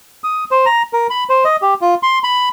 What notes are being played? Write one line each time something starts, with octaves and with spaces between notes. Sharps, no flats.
D#6
C5
A#5
A#4
B5
C5
D#5
G4
F4
C6
B5